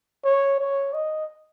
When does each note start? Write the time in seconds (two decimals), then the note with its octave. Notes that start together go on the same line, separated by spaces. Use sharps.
0.24 C#5
0.59 C#5
0.93 D#5